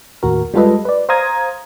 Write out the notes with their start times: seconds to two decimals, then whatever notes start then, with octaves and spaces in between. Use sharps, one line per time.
0.23 D#2 A2 F#4 A#4
0.54 G3 G#3 F4 A4 B4 D#5
0.85 B4 D5
1.09 C5 F5 A#5 D#6 G#6